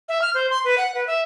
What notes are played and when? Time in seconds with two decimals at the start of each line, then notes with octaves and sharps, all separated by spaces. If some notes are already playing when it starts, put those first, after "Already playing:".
0.09 E5
0.22 F6
0.34 C5
0.50 C6
0.64 B4
0.78 F#5
0.95 B4
1.07 E5